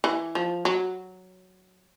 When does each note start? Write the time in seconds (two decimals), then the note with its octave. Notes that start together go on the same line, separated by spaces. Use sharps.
0.04 E3
0.35 F3
0.65 F#3